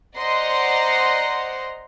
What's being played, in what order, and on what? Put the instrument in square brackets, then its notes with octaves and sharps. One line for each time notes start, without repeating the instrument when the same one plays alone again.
[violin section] C5 D5 D#5 F#5 A#5 C6